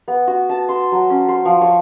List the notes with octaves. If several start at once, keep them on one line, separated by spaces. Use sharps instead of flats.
B3
F#4
A5
C6
F#3
C#4
C5
F3
C#5